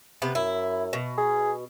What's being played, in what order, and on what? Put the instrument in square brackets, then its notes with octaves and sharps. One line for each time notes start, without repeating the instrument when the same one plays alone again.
[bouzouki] C3 B3
[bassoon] F#2 [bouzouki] E4
[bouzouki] B2
[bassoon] G#4